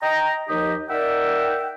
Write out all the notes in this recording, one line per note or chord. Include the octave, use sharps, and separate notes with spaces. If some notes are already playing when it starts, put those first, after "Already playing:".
D#5 G5 A#5
D#2 F3 D#4 G4 D#5
D#4 A#4 D5 E5 F#5 G5